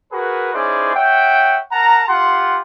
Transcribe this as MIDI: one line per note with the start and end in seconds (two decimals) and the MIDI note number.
0.12 0.51 66
0.12 0.51 68
0.12 0.51 70
0.12 0.51 71
0.54 0.94 61
0.54 0.94 63
0.54 0.94 64
0.54 0.94 68
0.54 0.94 72
0.54 0.94 74
0.94 1.61 73
0.94 1.61 76
0.94 1.61 78
0.94 1.61 79
1.72 2.04 70
1.72 2.04 78
1.72 2.04 81
1.72 2.04 82
2.08 2.61 65
2.08 2.61 67
2.08 2.61 78
2.08 2.61 84